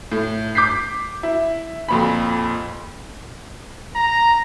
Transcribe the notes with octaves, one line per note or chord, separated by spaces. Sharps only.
A2
D6 G6 B6 C7
E4
F2 A#2 B5
A#5